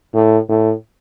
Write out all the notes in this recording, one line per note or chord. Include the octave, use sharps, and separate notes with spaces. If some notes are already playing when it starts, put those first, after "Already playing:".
A2
A2